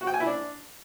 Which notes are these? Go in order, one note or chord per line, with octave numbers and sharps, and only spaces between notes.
F#4
G5
G#5
E4
D4